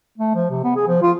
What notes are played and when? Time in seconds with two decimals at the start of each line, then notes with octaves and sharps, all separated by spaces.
0.18 A3
0.35 F3
0.50 C3
0.64 B3
0.76 G#4
0.87 F3
1.02 F4